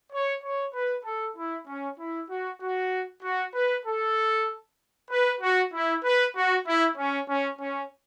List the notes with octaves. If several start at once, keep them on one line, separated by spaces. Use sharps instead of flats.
C#5
C#5
B4
A4
E4
C#4
E4
F#4
F#4
F#4
B4
A4
B4
F#4
E4
B4
F#4
E4
C#4
C#4
C#4